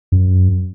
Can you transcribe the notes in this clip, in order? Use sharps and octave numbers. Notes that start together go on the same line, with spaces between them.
F#2